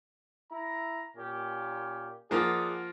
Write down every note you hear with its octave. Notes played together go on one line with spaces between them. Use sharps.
E4 A#5
A#2 C#4 G4
F3 A#3 F4 G#4 D5 F#5